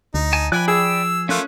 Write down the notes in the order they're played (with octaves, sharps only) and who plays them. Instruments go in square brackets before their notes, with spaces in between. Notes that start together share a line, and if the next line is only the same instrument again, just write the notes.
[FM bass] D2 [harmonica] D#4
[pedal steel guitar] G#5 A5
[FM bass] F3 [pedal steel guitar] D5 G5 B5 [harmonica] G#5 [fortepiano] F#6
[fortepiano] G#4 [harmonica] E6
[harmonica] A3 A#3 F4 [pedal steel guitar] C#4 F#6